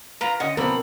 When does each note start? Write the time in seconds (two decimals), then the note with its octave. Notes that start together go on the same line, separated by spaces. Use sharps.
0.21 A#3 F4 B4 A#5
0.40 D3 C#4 D#5 F#5 G5
0.57 B2 F3 B3 C4 D4 E4 A#4 B5